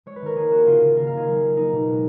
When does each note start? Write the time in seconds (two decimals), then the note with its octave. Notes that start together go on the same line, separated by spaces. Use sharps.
0.06 G#3 C#5
0.16 B4
0.22 D#3 A#4
0.36 A#3 G#4
0.51 A#3 F#4
0.66 C#3 F4
0.82 C#3
0.96 D#3 A#4
1.07 F5
1.13 D#3 G#4
1.28 F#3
1.42 A#3
1.57 A#3 D#4
1.72 B2
1.88 G#3